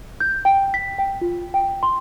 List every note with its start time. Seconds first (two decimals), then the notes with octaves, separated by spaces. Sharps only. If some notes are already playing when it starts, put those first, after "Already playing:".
0.20 G6
0.45 G5
0.74 B6
0.98 G5
1.21 F4
1.54 G5
1.83 C6